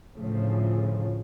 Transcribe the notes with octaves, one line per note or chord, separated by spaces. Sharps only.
D2 A2 C#3 F3 A3